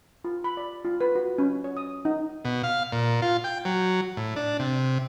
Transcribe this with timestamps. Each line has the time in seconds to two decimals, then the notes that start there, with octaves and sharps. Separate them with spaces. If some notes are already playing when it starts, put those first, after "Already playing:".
0.25 F4
0.44 B5
0.57 D5
0.85 F4
1.01 B4
1.15 F#4
1.38 C#4
1.64 C#5
1.77 D#6
2.05 D#4
2.45 B2
2.63 F5
2.92 A#2
3.22 F4
3.44 G5
3.65 F#3
4.17 A2
4.36 D4
4.59 C3